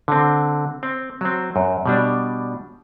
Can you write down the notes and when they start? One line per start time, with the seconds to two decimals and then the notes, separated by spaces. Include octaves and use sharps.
0.08 D3 C4
0.83 C4
1.21 F#3 C4
1.56 F#2
1.86 B2 G3 D4